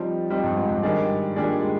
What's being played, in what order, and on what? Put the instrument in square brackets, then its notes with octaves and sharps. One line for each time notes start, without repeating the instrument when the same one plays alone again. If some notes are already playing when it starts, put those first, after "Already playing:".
Already playing: [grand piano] F3 [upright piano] G3 C4 D#4
[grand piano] F3 [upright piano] G3 C4 D#4
[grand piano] G2
G#2
G2
[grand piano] G#2 [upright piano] D#3 G3 D4 G#4 D5
[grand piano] A#2 [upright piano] D#3 G3 D4 G#4 D5
[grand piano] G#3